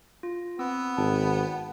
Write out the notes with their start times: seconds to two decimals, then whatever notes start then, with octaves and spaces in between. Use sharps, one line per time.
0.23 F4
0.59 B3 C4 E6
0.97 G#1 G5 A5